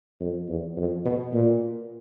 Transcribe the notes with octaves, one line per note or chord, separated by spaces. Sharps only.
F2
E2
F2
B2
A#2